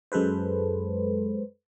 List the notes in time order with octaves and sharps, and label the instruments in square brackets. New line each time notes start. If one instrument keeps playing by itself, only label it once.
[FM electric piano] F#2 G#3 A4 B4 C5